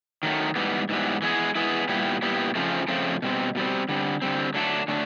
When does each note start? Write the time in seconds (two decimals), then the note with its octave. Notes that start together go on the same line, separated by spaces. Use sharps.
0.23 D#3 F#3 A3
0.56 G#2 E3 G3 B3
0.89 G#2 E3 G3 B3
1.22 E3 G#3 B3 E4 G#4
1.55 E3 G#3 B3 E4 G#4
1.89 A#2 G3 B3 E4 G4
2.22 A#2 G3 B3 E4 G4
2.55 F2 C#3 F3 A3 C4
2.88 F2 C#3 F3 A3 C4
3.22 B2 G3 C4
3.55 B2 G3 C4
3.89 D3 G3 C4
4.22 D3 G3 C4
4.54 D3 F#3 A3 D4
4.88 D3 F#3 A3 D4